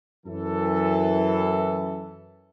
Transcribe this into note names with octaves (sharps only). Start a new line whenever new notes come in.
F#2 E3 A4